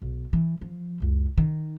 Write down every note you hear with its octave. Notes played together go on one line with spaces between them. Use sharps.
B1
E3
F3
C#2 F#2
D#3